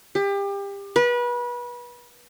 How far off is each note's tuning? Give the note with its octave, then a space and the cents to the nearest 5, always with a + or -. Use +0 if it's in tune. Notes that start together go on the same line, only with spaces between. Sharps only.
G4 +30
B4 -30